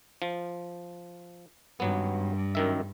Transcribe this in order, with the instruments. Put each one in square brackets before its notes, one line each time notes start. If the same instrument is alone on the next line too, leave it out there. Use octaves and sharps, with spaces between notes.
[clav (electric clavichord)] F3
[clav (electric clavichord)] G#1 F#3 B3 [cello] G2
[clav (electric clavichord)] F#2 D#3 E5